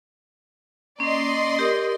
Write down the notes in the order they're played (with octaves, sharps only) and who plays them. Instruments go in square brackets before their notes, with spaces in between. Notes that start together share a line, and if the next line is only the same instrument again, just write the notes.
[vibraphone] A#3 C#4 [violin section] D5 D#5 C6
[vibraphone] G4 A#4 D#6